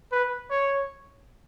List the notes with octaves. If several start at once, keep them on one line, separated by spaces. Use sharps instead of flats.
B4
C#5